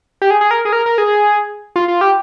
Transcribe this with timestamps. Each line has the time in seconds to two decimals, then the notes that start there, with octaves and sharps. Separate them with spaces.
0.22 G4
0.31 G#4
0.41 G#4
0.51 A#4
0.65 G#4
0.73 A#4
0.86 A#4
0.98 G#4
1.76 F4
1.88 F4
2.01 G4